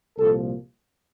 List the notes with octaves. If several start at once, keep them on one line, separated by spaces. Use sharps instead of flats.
C2 A#2 F3 A4